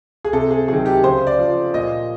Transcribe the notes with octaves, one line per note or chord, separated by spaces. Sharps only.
G#4
C3 A4
G#4
D#3 F#3 G#4
G4
C#3 C5
D5
F3
A#2 D#5